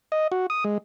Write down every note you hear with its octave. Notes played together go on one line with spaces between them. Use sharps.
D#5
F#4
D#6
G#3